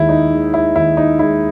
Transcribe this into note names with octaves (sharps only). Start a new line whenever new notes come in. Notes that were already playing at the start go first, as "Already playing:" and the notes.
Already playing: D#2 D#3 G#3 E4
D#4
D#3 G#3
E4
D#2 E4
D#4
D#3 G#3 E4